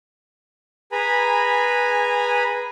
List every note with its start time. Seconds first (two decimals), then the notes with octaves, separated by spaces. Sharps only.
0.92 G#4 B4 G#5 A#5 B5